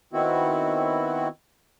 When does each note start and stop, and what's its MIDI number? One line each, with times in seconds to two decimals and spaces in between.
0.13 1.28 51
0.13 1.28 59
0.13 1.28 60
0.13 1.28 64
0.13 1.28 66